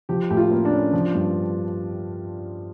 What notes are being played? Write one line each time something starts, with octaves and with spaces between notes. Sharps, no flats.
F3 G4
A2 G4
F4
A#3
D4
C#4
F3
G2